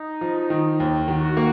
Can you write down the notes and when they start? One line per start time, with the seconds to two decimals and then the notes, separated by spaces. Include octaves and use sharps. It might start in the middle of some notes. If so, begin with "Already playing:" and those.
Already playing: D#4
0.21 F3
0.50 D#3
0.80 D#2
1.08 D#3 F#4
1.37 A#3